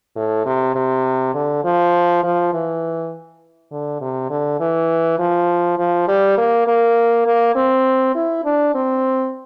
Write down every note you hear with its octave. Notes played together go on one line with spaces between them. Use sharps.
A2
C3
C3
D3
F3
F3
E3
D3
C3
D3
E3
F3
F3
G3
A#3
A#3
A#3
C4
E4
D4
C4